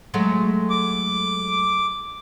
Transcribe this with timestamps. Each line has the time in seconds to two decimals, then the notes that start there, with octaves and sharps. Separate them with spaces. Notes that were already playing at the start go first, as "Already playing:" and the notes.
0.14 F#3 G#3 A3
0.70 D6